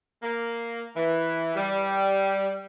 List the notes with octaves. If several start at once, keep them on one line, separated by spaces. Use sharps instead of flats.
A#3
E3
G3